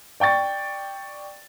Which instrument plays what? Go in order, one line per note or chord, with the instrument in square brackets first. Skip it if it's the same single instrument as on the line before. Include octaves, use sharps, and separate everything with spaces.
[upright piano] D5 G5 C#6 A6